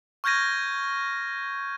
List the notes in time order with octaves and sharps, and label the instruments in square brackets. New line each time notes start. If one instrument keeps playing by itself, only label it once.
[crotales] C#6 F6 G6 G#6 A#6 D#7